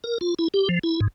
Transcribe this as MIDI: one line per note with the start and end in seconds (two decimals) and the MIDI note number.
0.04 0.18 70
0.21 0.34 65
0.39 0.48 64
0.54 0.68 67
0.69 0.79 53
0.83 1.00 64
1.01 1.08 44